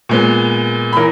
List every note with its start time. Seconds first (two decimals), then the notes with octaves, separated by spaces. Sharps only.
0.09 A#2 G#3 B3
0.93 B5
0.97 E3 A#4